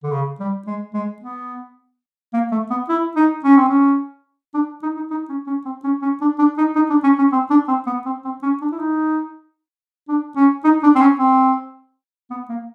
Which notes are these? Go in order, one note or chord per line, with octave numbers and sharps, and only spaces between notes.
D3
C#3
G3
G#3
G#3
B3
A#3
A3
B3
E4
D#4
C#4
C4
C#4
D4
D#4
D#4
D#4
C#4
C#4
C4
C#4
C#4
D4
D4
D#4
D#4
D4
C#4
C#4
C4
D4
C4
B3
C4
C4
C#4
D4
E4
D#4
D4
C#4
D#4
D4
C4
C#4
C4
B3
A#3